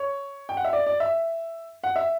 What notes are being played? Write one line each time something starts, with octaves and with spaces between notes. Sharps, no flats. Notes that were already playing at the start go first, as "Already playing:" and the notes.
Already playing: C#5
G5
F#5
E5
D5
D5
E5
F#5
E5